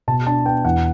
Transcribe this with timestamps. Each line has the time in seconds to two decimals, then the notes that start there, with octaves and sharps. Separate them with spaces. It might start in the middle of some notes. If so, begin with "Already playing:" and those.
0.08 B2 A5
0.27 D4 A5
0.45 B3 G5
0.65 E2 F#5